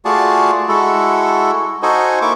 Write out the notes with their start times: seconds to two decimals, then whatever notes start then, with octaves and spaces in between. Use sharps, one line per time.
0.05 A3 F4 F#4 G#4 D5 A5
0.68 G#3 E4 F#4 A4
1.83 D#4 F#4 A4 C5 D#5 G#5
2.22 A#3 E4 C#6 D6